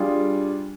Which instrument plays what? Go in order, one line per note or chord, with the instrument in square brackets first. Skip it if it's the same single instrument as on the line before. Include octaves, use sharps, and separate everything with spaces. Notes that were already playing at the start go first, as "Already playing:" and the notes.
Already playing: [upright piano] G3 D4 F4 G#4